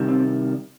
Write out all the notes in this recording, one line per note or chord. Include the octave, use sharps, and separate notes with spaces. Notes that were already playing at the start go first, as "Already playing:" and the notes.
Already playing: C3 D#3 G3
C4